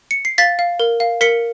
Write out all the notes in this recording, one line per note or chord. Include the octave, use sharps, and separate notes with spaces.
C#7
C7
F5 A6 B6
F5
A#4
F5
A#4 B6 C#7